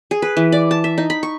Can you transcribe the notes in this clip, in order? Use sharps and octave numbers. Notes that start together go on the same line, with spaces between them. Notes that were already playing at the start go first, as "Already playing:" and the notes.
G#4
B4
E3
D5
A5
E5
D#4
B5
C#6